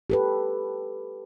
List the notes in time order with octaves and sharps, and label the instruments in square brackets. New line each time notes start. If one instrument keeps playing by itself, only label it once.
[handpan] G4 A4 B4